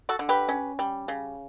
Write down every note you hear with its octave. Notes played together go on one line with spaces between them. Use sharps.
F#4 A4
D3
G4 B4
C#4
G3
C#3